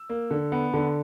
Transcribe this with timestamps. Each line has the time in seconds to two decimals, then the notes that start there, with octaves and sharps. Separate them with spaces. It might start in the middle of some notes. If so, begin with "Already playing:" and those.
Already playing: E6
0.10 A#3
0.31 D3
0.52 B3
0.73 D3